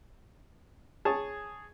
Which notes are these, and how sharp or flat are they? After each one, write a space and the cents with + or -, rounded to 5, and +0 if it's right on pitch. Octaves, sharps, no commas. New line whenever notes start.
G#4 +0 C#5 +0 A5 +0